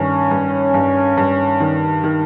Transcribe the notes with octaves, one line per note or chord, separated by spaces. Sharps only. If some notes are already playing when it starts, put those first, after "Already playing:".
Already playing: G2 D#3 C#4
G2
G2
G2
D#3
D#3